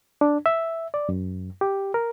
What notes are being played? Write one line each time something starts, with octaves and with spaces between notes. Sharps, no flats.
D4
E5
D5
F#2
G4
A#4